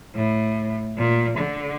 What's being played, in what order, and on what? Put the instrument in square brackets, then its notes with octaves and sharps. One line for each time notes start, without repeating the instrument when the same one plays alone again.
[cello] A2
A#2
D3